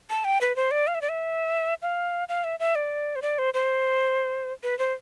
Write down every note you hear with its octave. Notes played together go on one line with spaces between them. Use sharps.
A5
G5
B4
C5
D5
F5
E5
D5
E5
F5
F5
E5
E5
D5
C5
D5
C5
C5
B4
C5